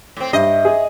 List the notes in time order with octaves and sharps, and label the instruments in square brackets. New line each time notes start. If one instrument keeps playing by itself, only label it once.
[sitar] A2 C4
[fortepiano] G2 [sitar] D#5 [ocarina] E5
[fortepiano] G#4